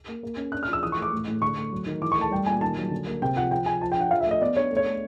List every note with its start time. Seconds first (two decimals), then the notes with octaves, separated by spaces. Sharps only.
0.08 A#3
0.23 A#3
0.37 C#4
0.52 D4 F#6
0.63 F6
0.68 F3
0.73 E6
0.83 E3 D#6
0.92 C#6
0.97 A3
1.02 D6
1.13 A2
1.27 A2
1.42 D3 C#6
1.57 A3
1.72 F#3
1.86 D#3
2.02 E3 D6
2.12 C#6
2.17 A3 A5
2.31 G3 G5
2.46 A#2 G#5
2.61 D#3 A5
2.77 F#3
2.91 D3
3.07 A#3
3.22 C3 G5
3.36 F3 F#5
3.51 F3 G5
3.66 F3 G#5
3.81 F3 A5
3.92 G5
3.96 D4 F#5
4.11 F3 F5
4.21 E5
4.26 A3
4.31 D#5
4.41 B3 D5
4.57 D4 C#5
4.71 A3
4.77 C#5
4.86 A3